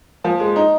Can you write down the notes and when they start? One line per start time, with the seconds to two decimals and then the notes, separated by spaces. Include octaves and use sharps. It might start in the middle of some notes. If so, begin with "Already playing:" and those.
0.24 F3
0.40 G#3
0.56 D#4